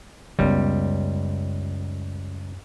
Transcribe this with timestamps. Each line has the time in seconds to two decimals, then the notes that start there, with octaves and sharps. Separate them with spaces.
0.39 C#2 F#2 G3 B3